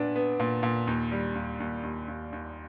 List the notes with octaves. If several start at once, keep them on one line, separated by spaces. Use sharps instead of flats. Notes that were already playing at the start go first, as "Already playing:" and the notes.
Already playing: A#2 B3 D4
B3
A#2
A#2
D#2
G3
D#2
D#2
D#2
D#2
D#2